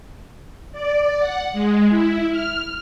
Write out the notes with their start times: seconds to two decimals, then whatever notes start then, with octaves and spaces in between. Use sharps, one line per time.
0.72 D5
1.19 F#5
1.53 G#3
1.89 E4
2.31 F6